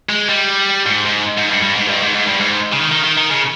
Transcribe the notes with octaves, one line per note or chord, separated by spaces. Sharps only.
G#3
G3
G#2
G#2
G#2
G2
G2
G#2
G2
G#2
G#2
G2
G#2
C#3
D#3
D#3
D#3
D#3
C#3